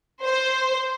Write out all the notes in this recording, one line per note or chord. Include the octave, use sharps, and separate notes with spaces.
C5